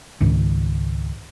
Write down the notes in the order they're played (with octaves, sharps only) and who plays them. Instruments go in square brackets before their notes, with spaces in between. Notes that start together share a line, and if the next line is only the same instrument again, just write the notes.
[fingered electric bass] C#2 G#2 D#3